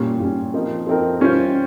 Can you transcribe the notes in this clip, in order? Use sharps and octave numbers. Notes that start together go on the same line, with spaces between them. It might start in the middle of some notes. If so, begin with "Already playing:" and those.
Already playing: A#2 G3 C#4
A#2 G3 C#4
F3 C4 D#4 A#4
F3 C4 D#4 A#4
G3 C#4 F4 C5